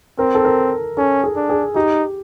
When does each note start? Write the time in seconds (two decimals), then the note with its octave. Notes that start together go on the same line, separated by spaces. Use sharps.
0.19 C4 A#4
0.35 A4
0.45 A#4
0.97 C#4 A4
1.24 G#4
1.36 D4
1.49 G#4
1.76 D#4 G4